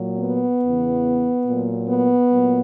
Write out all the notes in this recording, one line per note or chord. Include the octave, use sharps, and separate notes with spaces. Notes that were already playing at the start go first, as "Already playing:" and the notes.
Already playing: A#2 F#3
B3
E2 C#3 E3
A#2 F#3
B3
A#2 F#3